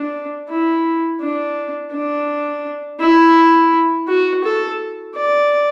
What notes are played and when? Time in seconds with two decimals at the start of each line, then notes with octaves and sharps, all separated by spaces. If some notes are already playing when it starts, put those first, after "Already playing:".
Already playing: D4
0.49 E4
1.20 D4
1.92 D4
3.00 E4
4.08 F#4
4.44 A4
5.15 D5